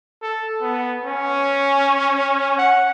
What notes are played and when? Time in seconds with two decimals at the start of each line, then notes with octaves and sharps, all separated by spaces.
0.22 A4
0.61 B3
1.05 C#4
2.58 F#5